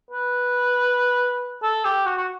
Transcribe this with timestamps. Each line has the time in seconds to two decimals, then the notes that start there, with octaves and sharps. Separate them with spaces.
0.11 B4
1.63 A4
1.85 G4
2.06 F#4
2.17 F#4